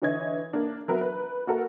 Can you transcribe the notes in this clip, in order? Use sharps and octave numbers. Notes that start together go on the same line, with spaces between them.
D3 E3 C#5 D#5 E5 G#6
A#3 D4
F#3 B3 A#4 B4 E5
B4
A#3 F#4 A4 A#4